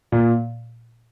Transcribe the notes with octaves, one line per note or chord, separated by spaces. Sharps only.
A#2